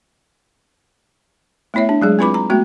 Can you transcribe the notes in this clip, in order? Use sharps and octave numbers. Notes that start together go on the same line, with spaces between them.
A3 B3 E4 C#5 E5
D4
F#3 G#3 G#4
C4 E4 F4 B4 B5 D6
A#5
G#3 A3 B3 F#4 G5